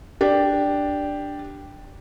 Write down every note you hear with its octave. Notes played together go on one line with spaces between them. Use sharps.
D4 G4